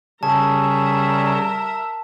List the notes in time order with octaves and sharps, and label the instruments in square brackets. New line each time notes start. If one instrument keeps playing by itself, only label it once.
[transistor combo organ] C#3 G#4 [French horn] G3 [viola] A#4 E5 [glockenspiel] A5